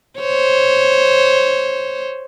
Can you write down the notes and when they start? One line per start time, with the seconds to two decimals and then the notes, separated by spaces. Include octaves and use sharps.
0.19 C5 C#5